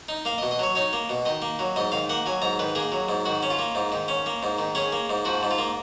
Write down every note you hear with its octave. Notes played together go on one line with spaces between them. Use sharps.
D#4
A#3 F5
D#5
B2
D#5
F#3 C#5
D#4 C#5
A#3
B2
D#3 D#5
A#3
F#3
G#2 D#5
D#3 F5
A#3 F#5
F#3 G#5
G#2 A#5
D#3 B4
A#3 G#4
F#3
G#2
D#3 F#4
C#4
F4
A#3
G#2
D#3
C#4
A#3
G#2
D#3
C#4 G#4
A#3
G#2
F3 F#4
G#2
F4
A#3